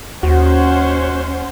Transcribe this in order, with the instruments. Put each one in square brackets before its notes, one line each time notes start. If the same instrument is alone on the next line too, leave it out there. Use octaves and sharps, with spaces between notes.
[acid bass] D#2 [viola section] C#4 C5 [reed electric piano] F#4 [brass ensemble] F#5